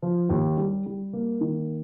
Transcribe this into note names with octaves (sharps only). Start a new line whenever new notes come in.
F3
D#2
G3
G3
A#3
D#3